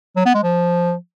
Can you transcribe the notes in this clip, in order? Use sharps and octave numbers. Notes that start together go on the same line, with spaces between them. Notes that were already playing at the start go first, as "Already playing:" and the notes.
F#3
B3
G#3
F3